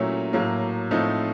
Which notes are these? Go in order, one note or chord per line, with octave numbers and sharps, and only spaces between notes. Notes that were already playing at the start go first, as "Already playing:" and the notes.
Already playing: A#2 F#3 A3 C#4 E4
A2 F#3 A#3
A2 F3 A3 C4 D#4